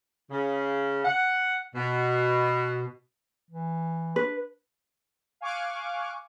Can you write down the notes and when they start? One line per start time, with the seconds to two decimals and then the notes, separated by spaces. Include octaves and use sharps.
0.31 C#3
1.04 F#5
1.75 B2
3.50 E3
4.16 D4 B4
5.41 F5 G#5 C#6 D6 F6 F#6